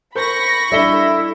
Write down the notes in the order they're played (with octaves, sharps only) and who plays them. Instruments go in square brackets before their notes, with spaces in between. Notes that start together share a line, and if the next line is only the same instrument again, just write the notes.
[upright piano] A#4 C5 G6 [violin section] B5 C#6 A#6
[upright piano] G3 E5 G7 [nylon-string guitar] D4 A4 D5 [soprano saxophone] E4